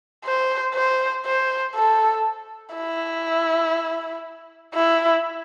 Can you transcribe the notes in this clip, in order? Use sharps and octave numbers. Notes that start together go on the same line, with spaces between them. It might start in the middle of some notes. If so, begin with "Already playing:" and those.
C5
C5
C5
A4
E4
E4